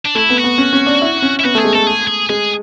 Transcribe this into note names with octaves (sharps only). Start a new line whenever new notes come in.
D4
A3 E4
B3
F#4
B3
C#4
C#4
D4
E4
C#4
E4
B3 F#4
A3
G#4
G#3
A3 A4
G#4
G#4
G#3 G#4